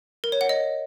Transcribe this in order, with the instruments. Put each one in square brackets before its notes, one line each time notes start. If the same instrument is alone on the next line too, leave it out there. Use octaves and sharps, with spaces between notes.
[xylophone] A#4
C#5
F#5
D#5